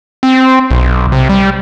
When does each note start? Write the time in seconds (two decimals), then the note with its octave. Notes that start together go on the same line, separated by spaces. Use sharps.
0.23 C4
0.71 B1
1.12 C3
1.29 G3